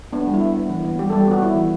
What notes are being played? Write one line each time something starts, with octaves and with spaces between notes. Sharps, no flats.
B3 D4
G3
E4
B3
B3
E3
B3
G3 G4
G3 A4
G4
B3 F#4
B3 E4
E3